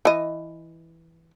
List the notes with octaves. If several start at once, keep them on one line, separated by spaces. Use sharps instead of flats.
E3 D#5